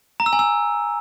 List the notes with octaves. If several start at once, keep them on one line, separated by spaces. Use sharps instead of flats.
A#5
E6
G#5
E6